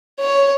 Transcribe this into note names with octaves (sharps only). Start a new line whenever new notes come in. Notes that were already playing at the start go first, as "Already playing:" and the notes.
C#5